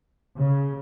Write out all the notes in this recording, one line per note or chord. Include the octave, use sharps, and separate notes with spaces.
C#3